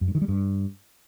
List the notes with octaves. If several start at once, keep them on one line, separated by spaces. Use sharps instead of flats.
F#2
G2
D#3
G3
G2